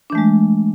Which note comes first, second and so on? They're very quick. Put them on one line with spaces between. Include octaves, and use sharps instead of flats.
D4 E3 A3 G#3